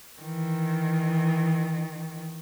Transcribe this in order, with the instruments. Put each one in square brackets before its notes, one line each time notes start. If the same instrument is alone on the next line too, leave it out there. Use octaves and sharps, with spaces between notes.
[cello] D#3 E3